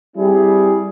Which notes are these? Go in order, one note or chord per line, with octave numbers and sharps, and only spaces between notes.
G3 C4 E4 G#4